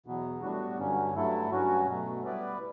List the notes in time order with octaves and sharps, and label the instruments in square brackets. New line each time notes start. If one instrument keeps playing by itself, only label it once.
[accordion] E2 B2 F#3 B3
A2 G3 B3 D4 F#4
G2 D3 F#3 C#4
G2 F#3 A3 E4 A4
G2 F#3 C#4 F#4
B2 F#3 A3
G3 B3 E4 B4 D5